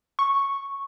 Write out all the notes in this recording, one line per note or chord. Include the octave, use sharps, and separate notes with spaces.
C#6